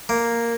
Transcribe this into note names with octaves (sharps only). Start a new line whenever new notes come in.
A#3